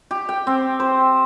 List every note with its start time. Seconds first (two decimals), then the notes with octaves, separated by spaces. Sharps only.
0.11 G4
0.29 G5
0.47 C4
0.80 C5